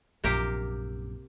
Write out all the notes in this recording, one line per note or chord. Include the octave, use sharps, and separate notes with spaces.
A#1 F#2 C3 A#3 G4